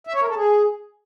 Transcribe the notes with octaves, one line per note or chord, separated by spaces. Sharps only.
E5
C#5
A#4
A4
G#4